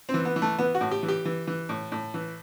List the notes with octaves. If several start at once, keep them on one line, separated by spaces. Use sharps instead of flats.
C4
E3
B3
E3
A3
E3 B3
F#4
A2
G4
E3
G4
E3
E3
A2
A2
E3